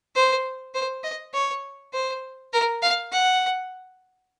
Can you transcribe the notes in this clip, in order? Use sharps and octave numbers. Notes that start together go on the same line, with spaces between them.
C5
C5
D#5
C#5
C5
A#4
F5
F#5